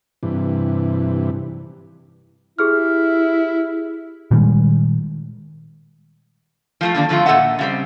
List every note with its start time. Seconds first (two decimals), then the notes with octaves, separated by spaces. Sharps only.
0.23 G2 C3 E3
2.59 E4 G4 G#4 F6
4.31 A#2 D#3 G3 G#3
6.81 F3 A3 F4
6.95 D3 D#3 A#3 D4
7.09 F2 D3 F3 A3 F4
7.26 A#2 G#3 A4 D#5 E5 F#5
7.59 C#3 G3 C4